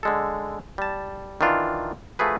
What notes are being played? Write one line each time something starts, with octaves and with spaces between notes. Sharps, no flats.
D3 G#3 A4
G3 A5
D#3 E3 D4 F4
F3 A3 F#4 G#4 B4